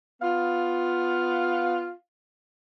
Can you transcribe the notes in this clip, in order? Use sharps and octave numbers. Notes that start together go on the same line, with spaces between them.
B3 F4 F5